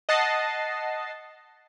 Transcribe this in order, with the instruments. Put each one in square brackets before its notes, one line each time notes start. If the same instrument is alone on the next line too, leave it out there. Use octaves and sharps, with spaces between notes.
[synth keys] D#5 F#5 A5 A6 C7